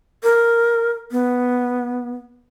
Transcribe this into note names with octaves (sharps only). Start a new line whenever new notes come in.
A#4
B3